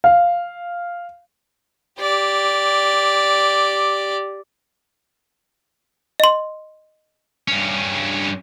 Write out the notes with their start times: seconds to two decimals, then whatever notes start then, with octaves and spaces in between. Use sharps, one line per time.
0.04 F5
2.00 G4 D5
6.20 D#5 C6
7.48 G2 C#4